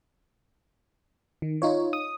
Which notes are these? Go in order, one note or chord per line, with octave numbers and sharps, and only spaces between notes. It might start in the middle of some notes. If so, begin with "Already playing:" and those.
D#3
D#4 F4 C#5
D#6